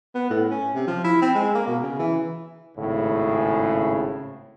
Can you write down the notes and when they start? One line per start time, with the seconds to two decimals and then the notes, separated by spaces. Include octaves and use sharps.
0.15 B3
0.30 A2
0.51 C#4
0.75 C3
0.88 F3
1.04 E4
1.22 C4
1.35 G#3
1.55 A#3
1.68 B2
1.83 C#3
1.99 E3
2.77 G#1 A2 C#3